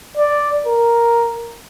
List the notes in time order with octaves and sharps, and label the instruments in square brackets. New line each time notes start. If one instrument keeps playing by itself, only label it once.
[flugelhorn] D5
A#4